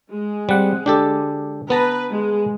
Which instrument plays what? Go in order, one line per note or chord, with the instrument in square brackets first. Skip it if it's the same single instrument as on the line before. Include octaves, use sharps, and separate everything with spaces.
[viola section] G#3
[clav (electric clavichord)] G3 [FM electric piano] C4 F#5
[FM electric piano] D3 [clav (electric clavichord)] D4 G4 A4
[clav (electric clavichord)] B3 A5 A#5 [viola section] B4
[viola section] G#3